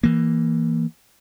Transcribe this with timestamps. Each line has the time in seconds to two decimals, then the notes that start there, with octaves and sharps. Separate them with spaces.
0.03 E3 A#3